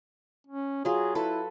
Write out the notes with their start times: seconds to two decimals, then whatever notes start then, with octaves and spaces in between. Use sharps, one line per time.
0.47 C#4
0.85 F#3 F4 G#4
1.15 E4 A4 B4